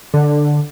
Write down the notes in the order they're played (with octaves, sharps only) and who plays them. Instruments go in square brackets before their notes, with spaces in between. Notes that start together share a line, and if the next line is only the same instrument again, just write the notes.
[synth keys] D3